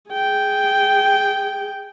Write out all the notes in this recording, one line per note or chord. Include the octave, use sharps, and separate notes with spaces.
G#4 G5